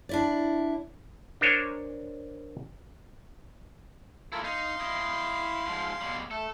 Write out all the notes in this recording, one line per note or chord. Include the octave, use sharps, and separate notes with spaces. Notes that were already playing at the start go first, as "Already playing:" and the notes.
D4 E4 D5
D4 A#4 C5 C#5 G#5
A#3 E4 F4 A4 A#4
D#4 F5 C6
E4 D#5
G#2 F3
B2 G3
A3 A4